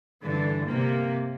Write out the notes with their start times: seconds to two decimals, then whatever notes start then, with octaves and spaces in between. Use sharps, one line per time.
0.23 G2 D3 E3
0.64 C3 A#3